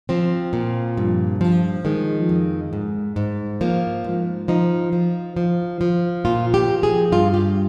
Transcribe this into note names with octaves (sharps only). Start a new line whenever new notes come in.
F3 C4
A#2
G2
F3
D#3 G#3
F2
G#2
G#2
F3 A#3
G#2
F3 D#4
F3
F3
F3
A#2 F4
G4
A#2
G#4
G2 F4
G4